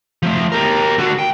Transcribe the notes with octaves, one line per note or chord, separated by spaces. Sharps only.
F3 A3
G4 A#4
D3 F#4
G5